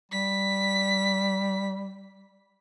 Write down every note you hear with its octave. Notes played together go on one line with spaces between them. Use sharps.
G3 B6